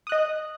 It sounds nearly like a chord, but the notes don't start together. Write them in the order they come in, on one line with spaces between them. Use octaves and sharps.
D#6 F#6 D#5